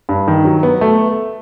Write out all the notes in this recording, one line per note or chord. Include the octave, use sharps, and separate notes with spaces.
G2
D#3
F#3
B3
A3